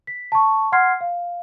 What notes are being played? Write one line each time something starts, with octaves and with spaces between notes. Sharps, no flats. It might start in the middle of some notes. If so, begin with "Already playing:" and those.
B6
A5 C#6
F#5 C6 F6 G#6 C7
F5